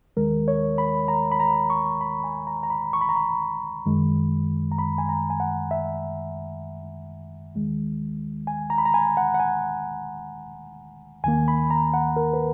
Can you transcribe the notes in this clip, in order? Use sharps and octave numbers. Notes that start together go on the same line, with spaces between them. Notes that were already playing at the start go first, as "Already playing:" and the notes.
D#2 D#3 G#3 A#4
C#5
B5
A#5
B5
A#5
C#6
B5
G#5
A#5
A#5
B5
C#6
B5
A#5
B5
F#2 D#3 G#3
A#5
B5
G#5
A#5
G#5
F#5
E5
D#2 D#3 G#3
G#5
A#5
B5
A#5
G#5
F#5
F#5
G#5
D#2 D#3 A#3 G#5
B5
A#5
F#5
A#4
B4